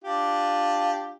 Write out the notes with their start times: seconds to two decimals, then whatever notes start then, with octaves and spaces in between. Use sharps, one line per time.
0.04 D4 F4 G4